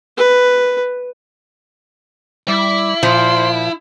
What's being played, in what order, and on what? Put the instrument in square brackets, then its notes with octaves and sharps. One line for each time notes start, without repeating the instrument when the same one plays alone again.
[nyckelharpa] B4
[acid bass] G3 [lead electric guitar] E4 [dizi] D6
[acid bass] A#2 [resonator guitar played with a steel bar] F3 [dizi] C5